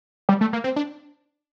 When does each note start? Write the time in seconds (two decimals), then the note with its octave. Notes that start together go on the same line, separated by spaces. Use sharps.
0.29 G3
0.41 A3
0.53 A#3
0.64 C4
0.76 D4